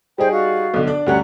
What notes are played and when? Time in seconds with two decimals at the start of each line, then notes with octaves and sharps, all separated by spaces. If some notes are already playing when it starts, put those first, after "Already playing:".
0.18 G3 D#4 G#4 C5 G5 G#5
0.32 F#4 D5 F5
0.74 B1 D3
0.87 D4 D5
1.07 D2 G3 C#4 F#5 A#5 F#6